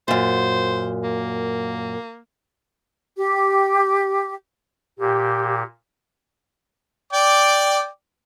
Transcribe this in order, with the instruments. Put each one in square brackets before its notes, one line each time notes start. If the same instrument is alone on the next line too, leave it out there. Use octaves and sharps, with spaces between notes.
[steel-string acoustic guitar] F#2 A#2 [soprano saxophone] C5
[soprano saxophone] A#3
[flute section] G4
[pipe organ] A#2 [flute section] G4
[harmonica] D5 G5 D6